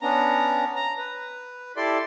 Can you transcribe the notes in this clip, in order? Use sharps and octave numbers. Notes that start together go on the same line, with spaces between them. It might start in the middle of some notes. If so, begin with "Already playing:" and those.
B3 C#4 D4 A#5
A#5
B4
E4 G4 A4 D5 C6